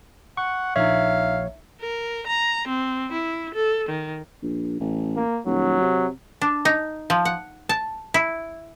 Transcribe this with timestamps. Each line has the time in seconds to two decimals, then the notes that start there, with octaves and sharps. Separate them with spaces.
0.37 F#5 C#6
0.76 A#1 D#4 C#5 E5 F5
1.81 A#4
2.27 A#5
2.68 C4
3.12 E4
3.55 A4
3.89 D#3
4.42 A#1
4.80 A1
5.17 A#3
5.46 D#1 F#3
5.81 C3
6.42 D4
6.65 D#4
7.10 F3
7.25 F#5
7.69 A5
8.14 E4